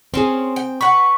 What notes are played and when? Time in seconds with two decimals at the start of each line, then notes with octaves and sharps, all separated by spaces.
0.14 C4 C#4 G#4 C5
0.56 G5
0.81 B4 F#5 C#6